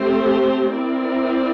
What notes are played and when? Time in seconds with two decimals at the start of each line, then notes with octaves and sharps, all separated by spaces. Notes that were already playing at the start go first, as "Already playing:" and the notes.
Already playing: A3 C4 G4 C5
0.71 C4 E4 A#4 D5